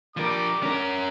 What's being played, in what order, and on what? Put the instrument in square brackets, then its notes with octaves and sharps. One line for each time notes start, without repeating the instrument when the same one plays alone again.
[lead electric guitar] F3 A#4 [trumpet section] G3 D6
[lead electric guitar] C#4 A#4